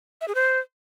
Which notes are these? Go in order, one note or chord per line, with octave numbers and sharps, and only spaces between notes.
E5
G#4
C5